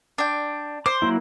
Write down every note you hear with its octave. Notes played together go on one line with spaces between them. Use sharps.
D4 G5
C5 D6
F#3 A#3 E4